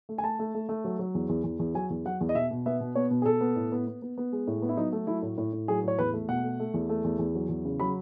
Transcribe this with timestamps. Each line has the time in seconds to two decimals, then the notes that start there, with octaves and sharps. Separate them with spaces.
0.09 A3
0.18 G#5
0.23 A3 A5
0.39 A3
0.54 A3
0.69 A3
0.85 F#3
0.99 F#3
1.15 E2
1.29 E2
1.44 E2
1.59 E2
1.75 F#3 G#5
1.90 E2
2.05 F#3 F#5
2.21 E2
2.29 D#5
2.35 B2 E5
2.51 B2
2.66 B3 E5
2.80 B2
2.95 B3 C#5
3.11 B2
3.22 G#4
3.26 B2 A4
3.41 B3
3.56 A2
3.72 B3
3.87 B3
4.02 B3
4.18 B3
4.33 G#3
4.47 A2
4.62 B3
4.69 E4
4.77 F#3 D#4
4.92 A3
5.07 F#3 E4
5.22 A2
5.38 A2
5.53 A2
5.68 F#3 G#4
5.83 A2 C#5
5.99 E2 B4
6.14 A3
6.29 B2 F#5
6.44 A3
6.60 A3
6.74 E2
6.89 A3
7.04 E2
7.19 E2
7.35 F#3
7.49 E2
7.65 C#3
7.80 F#3 B5